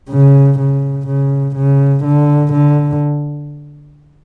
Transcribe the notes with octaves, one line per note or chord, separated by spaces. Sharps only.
C#3
C#3
C#3
C#3
D3
D3